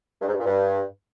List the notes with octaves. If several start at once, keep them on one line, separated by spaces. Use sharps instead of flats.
G2
G#2
G2
A#2
G2